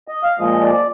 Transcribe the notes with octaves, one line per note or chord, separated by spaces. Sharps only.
D#5
F5
A#2 F3 G#3 D#5
D5